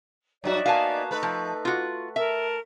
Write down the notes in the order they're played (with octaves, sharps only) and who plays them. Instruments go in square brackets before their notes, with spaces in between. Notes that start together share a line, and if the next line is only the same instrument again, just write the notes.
[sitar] G2 F#3 F#4 [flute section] D#4 D5 E5
[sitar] A#3 B3 F#4 [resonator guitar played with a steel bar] F5 G#5 A5
[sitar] A3 B4 [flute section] D#4
[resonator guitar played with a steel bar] F3
F4 F#4
[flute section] A#4 A5 [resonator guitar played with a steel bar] E5